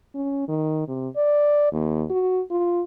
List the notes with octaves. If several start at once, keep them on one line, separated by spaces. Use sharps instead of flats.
C#4
D#3
C3
D5
D#2
F#4
F4